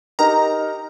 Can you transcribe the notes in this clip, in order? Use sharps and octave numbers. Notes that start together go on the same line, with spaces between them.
D#4 G4 A#4 A#5